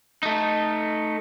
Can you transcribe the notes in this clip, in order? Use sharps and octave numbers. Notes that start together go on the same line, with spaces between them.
A3 D#4